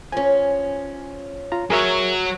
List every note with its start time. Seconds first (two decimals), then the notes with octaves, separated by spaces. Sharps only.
0.12 F3 C#4 G#5
1.52 F4 A#5
1.70 F#3 G#4 A#4 C#5 E5